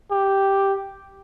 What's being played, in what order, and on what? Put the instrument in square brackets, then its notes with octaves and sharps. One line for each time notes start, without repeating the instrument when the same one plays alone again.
[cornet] G4